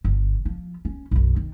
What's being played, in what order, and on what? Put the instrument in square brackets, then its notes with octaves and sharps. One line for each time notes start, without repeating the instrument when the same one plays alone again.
[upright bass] G1
F3
C#4
B1 F#2
D#3